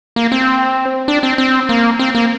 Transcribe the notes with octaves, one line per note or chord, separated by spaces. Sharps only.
A#3
C4
D4
C4
C4
A#3
C4
A#3